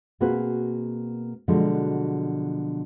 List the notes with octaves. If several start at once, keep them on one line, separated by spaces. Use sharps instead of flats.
B2 A#3 C4 F#4 G#4 B4
B2 D3 F3 F#3 G#3